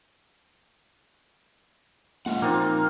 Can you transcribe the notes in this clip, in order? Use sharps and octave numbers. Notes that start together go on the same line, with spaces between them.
G#3 A#3 C#4 F4 F#5
A#2 F3 A#3 C4 D#4 F4